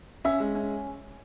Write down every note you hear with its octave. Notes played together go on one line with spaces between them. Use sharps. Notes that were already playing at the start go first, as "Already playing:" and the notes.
C#4 E5 E6
G#3
C#4